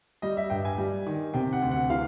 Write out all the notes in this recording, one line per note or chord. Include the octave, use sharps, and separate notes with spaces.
G3 D#5
E5
G2 G5
G#5
G3
D#3
C3 G5
F#5
D2
F#5
E3 F5